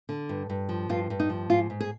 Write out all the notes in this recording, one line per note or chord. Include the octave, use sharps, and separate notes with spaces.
D3
G2
G2
F3
G2 F4
G2
D#4
F3
G#2 F4
G#2
G#4